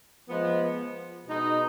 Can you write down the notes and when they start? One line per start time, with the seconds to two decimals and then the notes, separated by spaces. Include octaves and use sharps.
0.29 F3 G#3 B3
1.27 B2 G#3 D#4